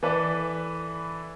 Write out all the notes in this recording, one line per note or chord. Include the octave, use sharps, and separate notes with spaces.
E3 A4 B4 D5